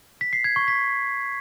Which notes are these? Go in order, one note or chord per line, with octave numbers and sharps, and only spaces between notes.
B6
C7
G#6
C#6
B6